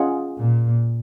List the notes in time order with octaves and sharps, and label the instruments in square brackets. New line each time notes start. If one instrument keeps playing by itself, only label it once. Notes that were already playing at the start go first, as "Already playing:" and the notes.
Already playing: [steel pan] C#4 F4 G#4 D#5 F#5
[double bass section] A#2